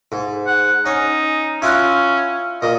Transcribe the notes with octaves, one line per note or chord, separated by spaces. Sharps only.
G#2
F#5
C#4 D#4
C#4 E4 F4 F#5
A#2 D#5